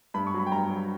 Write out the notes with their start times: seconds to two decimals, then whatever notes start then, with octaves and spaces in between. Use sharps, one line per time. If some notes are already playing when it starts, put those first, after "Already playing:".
0.14 G2 B5
0.27 C#6
0.34 F#3
0.40 B5
0.46 G5
0.52 G2 A#5
0.70 F#3